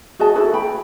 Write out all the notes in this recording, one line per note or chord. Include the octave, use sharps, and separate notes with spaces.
F#4 G#4 D#5 A5
E4 F#4 A4 B4
G5 B5